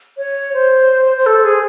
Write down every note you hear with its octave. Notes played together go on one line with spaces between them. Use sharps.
C#5
C5
C5
A4
G#4